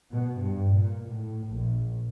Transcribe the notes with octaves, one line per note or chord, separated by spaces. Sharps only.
B2
G2
A#2
A2
A#1